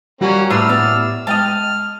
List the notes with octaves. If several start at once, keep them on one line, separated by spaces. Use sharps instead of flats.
G3 A#3 C#4 F#4
A2 D4 F4 G4 B4 F#5 E6 F6
B3 D5
G#3 D#5 G5 A5 F6